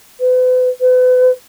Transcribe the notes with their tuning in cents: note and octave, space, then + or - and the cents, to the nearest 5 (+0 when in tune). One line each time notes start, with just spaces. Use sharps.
B4 +40
B4 +35